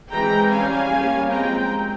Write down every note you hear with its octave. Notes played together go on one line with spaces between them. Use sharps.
E3 G#3 C4 G5 A#5
G3 C#4 F5 G#5
G3 A#3 C#4
F3 G#3 C4 G5 A#5